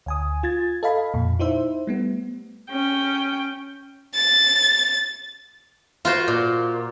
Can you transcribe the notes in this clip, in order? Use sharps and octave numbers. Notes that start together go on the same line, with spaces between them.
D2 G#5 D#6
F4 G#6 A6
A4 D#5 F5 B5
F2 A#2
D#4 E4 C5 E5
G3 A3 B3
C#4 G5
A6
F4 F#4 C5
A#2